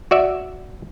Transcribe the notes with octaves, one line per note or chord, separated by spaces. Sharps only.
F#4 D5 E5